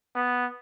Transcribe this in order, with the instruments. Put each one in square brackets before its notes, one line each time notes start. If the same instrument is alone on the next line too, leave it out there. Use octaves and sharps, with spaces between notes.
[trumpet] B3